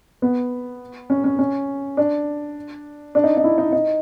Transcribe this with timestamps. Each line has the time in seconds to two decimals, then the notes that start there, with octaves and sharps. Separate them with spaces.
0.22 B3
1.10 C#4
1.24 C#4
1.39 C#4
1.97 D4
3.15 D4
3.24 D#4
3.37 D#4
3.44 E4
3.58 D#4
3.72 D#4